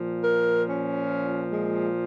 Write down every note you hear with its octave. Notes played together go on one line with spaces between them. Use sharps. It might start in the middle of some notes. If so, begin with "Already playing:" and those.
Already playing: A#2 F3
A#4
C#4
G#3